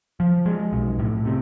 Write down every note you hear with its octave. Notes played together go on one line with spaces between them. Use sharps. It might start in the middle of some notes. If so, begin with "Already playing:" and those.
F3
G#3
B1
A2
C3